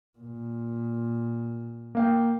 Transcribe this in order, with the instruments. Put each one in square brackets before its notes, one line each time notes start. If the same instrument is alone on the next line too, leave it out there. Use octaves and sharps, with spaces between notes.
[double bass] A#2
[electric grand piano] A#3 F5 G5